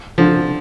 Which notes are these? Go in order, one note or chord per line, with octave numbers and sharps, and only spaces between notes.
D3 F3